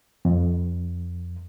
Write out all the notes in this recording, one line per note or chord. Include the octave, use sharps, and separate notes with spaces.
F2